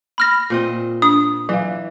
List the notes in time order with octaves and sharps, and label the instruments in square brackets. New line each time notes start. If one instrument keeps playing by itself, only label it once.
[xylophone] B5 F6 A#6
[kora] A#2 C4 D#5
[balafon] D4 [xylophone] D#6
[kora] E3 [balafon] F#3 F5